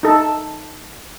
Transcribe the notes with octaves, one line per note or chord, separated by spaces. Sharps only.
D#4 A4